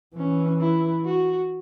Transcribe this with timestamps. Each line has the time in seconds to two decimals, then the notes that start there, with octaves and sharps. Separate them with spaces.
0.16 E3 C#4
0.61 E4
1.05 F#4